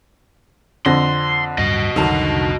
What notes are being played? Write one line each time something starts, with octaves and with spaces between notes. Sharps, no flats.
F2 D3 C6 A#6
D1 G2 F#4 D#5
F1 C2 D3 D#3 F#3 D4 A5